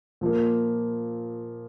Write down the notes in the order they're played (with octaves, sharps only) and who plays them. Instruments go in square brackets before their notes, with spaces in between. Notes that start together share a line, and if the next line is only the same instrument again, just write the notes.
[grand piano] A#2 F3 A#3